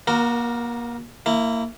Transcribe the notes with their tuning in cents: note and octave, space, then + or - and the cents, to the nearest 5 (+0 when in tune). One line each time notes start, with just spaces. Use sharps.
A#3 +30 F#4 +0 A#4 +0
A#3 -20 E4 +0